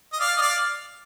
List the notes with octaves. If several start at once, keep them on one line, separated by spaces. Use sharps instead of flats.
D#5
D5 F5
D#5
D5 F5